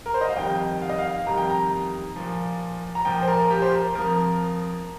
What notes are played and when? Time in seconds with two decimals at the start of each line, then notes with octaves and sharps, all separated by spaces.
0.06 A#4
0.14 C5
0.21 D#5
0.29 F5
0.36 F2 D#3 G3 G5
0.82 F5
0.90 D#5
0.98 F5
1.26 F2 D#3 G3 A#5
1.37 G5
1.49 A#5
2.16 A#2 F3
2.95 A#5
3.05 A#2 F3 G5
3.22 C5
3.28 A#4
3.50 G4
3.62 C5
3.73 A#4
3.95 F2 F3 A#4